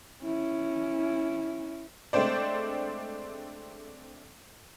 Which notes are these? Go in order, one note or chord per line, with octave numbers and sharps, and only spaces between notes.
C#4 E4
G#3 A3 C4 D4 C5 D5